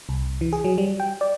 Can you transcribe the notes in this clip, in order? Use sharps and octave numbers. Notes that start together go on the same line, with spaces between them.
C2
E3
G#4
F#3
G3
G5
D5